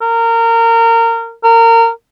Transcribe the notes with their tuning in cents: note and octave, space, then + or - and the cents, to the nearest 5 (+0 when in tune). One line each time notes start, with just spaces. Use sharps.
A#4 -25
A#4 -25